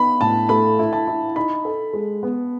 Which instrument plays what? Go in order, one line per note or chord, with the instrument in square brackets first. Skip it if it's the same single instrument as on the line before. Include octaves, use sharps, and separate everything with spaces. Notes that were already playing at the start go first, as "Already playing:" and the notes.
Already playing: [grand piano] B3 D#4 [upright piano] B5
[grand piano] A2 [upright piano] A5
[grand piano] A3 [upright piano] B5
[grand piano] E4
[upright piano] A5
[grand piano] E4
[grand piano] D#4 [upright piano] B5
[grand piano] A4
G#3
B3